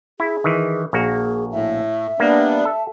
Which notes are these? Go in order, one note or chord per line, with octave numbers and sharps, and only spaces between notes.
E4 G#4
D#3 E3
A#1 A#3 F#4 G#4
A2 E5
G3 A#3 B3 D4
A4